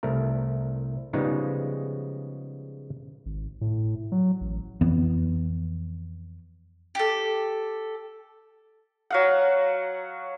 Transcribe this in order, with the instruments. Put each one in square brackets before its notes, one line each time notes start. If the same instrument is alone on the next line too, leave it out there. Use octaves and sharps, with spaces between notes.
[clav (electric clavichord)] C2 A3 A#4
C#3 F3 G3 G#3 B3 D#4
[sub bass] G#1
A2
F#3
A1
[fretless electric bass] F2 E3 B3
[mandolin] G4 A4
[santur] F#3 F5 F#5